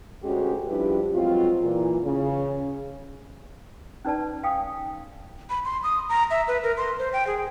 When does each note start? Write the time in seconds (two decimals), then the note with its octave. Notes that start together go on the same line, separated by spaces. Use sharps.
0.23 D2 G#3 C#4 F#4 G4
0.68 F3 G3 D4 E4 G4 B4
1.14 F3 F#3 G#3 C4 F4
1.62 A#2 E3
2.03 C#3
4.05 C#4 D#4 B4 D5 A5
4.44 F5 G5 G#5 D#6
5.50 B5
5.65 C6
5.83 D#6
6.09 A#5
6.31 E5
6.48 B4
6.63 A#4
6.77 C6
6.99 C5
7.13 G5
7.27 G#4